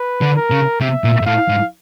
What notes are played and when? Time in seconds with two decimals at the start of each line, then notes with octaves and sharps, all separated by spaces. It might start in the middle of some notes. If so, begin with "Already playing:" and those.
Already playing: B4
0.22 D3
0.37 A#4
0.51 C#3
0.81 C3 E5
1.04 A#2
1.21 G#2
1.26 A2 F5
1.48 G#2